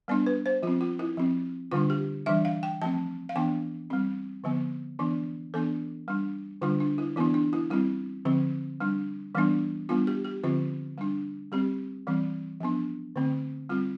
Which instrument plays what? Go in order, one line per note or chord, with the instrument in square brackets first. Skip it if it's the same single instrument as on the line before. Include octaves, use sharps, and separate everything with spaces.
[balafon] G3 B3 D4 D5
B4
C5
F3 C4 F4
F4
E4
F3 C4
D3 G3 D4 F4
G4
E3 G3 D4 E5
F5
G5
F3 A3 C4 A5
F5
E3 B3 D4 G5
G3 C4
D3 F3 B3
E3 B3 D4
E3 B3 D4 A4
G3 D4
D3 G3 D4 F4
D4
E4
E3 B3 D4 E4
D4
E4
G3 C4 E4
D3 F3 C4
G3 D4
E3 G3 B3 D4
G3 B3 D4 F4
G4
G4
D3 F3 C4 F4
G3 D4
G3 C4 G4
E3 G3 C4
F3 B3 D4
D3 A3 C4
G3 C4 F4